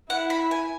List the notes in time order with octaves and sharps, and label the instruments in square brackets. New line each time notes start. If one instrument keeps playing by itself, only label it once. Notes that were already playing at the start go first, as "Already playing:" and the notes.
[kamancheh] E4 [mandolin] F#5
[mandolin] B5
G#5